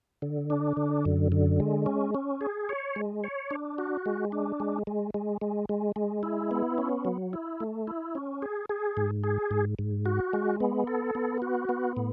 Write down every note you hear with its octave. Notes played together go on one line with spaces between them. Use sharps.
D3
D4
D3
F#2
D3
G#3
C#4
C#4
G#4
C#5
G#3
C#5
D4
F#4
G#3
D4
G#3
G#3
G#3
G#3
G#3
G#3
E4
B3
C#4
F#3
E4
A3
E4
C#4
G#4
G#4
G#2
G#4
G#2
G#2
F#4
G#3
B3
A4
B3
F#4
B3
A2